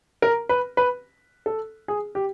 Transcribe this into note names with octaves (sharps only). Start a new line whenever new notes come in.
A#4
B4
B4
A4
G#4
G4